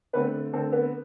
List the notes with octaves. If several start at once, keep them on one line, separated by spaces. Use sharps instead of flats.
D3 A3 B3 C4 B4
D3 A3 C4 A4
B3 B4